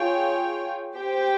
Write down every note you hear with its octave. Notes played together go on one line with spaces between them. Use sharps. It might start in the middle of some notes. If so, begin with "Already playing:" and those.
Already playing: F4 G#4 C#5 G5
G4 C5 G5